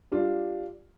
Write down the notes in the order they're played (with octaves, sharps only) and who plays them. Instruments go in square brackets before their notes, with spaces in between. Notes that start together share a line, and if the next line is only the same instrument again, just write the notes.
[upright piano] G3 D4 F4